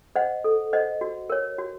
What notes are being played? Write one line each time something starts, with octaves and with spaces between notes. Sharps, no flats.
C5 D#5 F#5
A4
C5 D#5 F#5
F#4
A#4 C#5
F#4